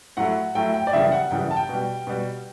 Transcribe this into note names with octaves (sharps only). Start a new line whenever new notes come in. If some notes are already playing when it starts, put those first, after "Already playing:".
A2 F#3 A3 F#5
A2 F#3 A3 G5
G5
D5
F#2 C#3 E3 G3 E5
F#5
F#2 C#3 E3 G3 G5
A5
G5
B2 G3
B2 G3